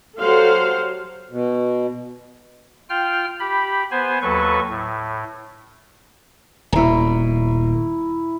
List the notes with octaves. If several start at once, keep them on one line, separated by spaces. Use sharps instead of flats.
F#3 G4 A4 C5 F5 F#5
B2
F4 G5 F6
G4 B5
B3 C5 G#5
D#2 F#3 A4 B4 C#6
A2
D#1 B2 E4 A#5